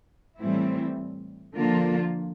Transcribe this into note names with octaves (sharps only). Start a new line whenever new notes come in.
A2 E3 G3 C4 E4
D3 F3 A#3 D4 F4